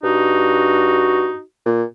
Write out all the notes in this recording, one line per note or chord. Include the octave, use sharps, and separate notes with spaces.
G2 D#4 F#4
A#2